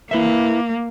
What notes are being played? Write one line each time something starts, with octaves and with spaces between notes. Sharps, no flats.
A#3 E4 B4 E5